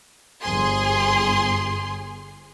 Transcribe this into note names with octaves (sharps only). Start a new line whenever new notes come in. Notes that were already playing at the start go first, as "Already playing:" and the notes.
G1 G#4 C6